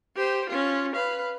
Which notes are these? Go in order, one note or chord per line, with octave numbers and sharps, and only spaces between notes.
G4 C5
C#4 F4
B4 F5